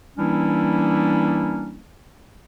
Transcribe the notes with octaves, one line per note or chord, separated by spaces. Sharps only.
E3 G3 A#3 C#4 D4 E4